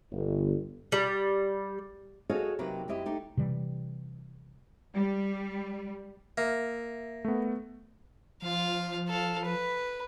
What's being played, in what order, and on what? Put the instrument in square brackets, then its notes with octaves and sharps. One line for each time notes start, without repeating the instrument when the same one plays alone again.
[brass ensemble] G1
[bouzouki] G3
[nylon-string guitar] F#4 G#4 A4 C#5 D#5 F5
C3 F#3 A#3 D#4 G4 B4
F#2 C4 E4 G4 D#5
A3 D#4 G4
[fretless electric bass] C3 E3 G3
[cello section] G3
[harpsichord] A#3 [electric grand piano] E5
[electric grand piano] A3 B3
[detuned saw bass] F3 [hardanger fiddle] F4 F5
[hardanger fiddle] A4 F5
B4